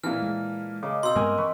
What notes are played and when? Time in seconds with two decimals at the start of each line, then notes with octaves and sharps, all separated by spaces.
0.04 A#2 E3 A#4 F5 A5 F6
0.22 G#3
0.83 C#3 A#3 D#5 D6
1.03 B2 C4 D#4 C6 E6
1.16 G2 G#3 B3 G4 A#4 G#5
1.38 E3 B4 B5 C#6